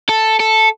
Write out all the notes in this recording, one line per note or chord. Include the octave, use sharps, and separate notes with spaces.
A4
A4